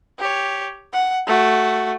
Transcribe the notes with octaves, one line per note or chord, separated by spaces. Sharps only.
G4 C#5
F#5
A3 F#4